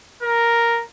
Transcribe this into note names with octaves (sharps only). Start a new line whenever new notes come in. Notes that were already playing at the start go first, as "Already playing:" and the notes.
A#4